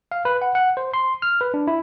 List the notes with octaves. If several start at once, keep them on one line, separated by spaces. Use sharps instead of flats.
F5
B4
F#5
F#5
C5
C6
F6
B4
D4
E4